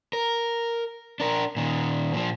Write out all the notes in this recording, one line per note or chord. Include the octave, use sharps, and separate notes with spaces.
A#4
D4 A#4
A#2 D#3
A#2 F3